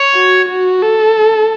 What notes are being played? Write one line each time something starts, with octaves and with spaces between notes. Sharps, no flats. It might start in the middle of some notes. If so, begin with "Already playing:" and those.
Already playing: C#5
F#4
F#4
A4